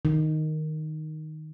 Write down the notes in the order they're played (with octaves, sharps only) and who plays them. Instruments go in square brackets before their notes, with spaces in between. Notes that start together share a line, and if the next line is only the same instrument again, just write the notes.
[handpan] D#3